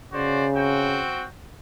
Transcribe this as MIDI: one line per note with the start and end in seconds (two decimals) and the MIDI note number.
0.13 1.02 49
0.13 0.47 66
0.13 0.47 72
0.13 0.47 74
0.54 1.24 60
0.54 1.24 66
0.54 1.24 79